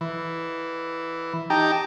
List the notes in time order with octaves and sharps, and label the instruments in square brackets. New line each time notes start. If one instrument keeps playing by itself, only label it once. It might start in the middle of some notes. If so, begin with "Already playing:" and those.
[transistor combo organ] E3
D#4 G4 G5 A5 A#5